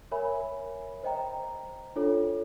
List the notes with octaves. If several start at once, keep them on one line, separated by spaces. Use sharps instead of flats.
A#4 C#5 E5 G#5 B5
C5 D#5 G5 A#5
D4 F4 A4 C#5